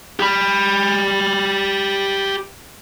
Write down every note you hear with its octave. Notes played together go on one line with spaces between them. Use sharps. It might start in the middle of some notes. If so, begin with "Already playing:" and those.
G4 B5